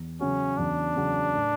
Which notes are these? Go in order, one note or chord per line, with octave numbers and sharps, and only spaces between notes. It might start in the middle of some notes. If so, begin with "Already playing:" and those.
Already playing: E2
C#3 F#3 C#4
E2 D4
C#3 F#3
A2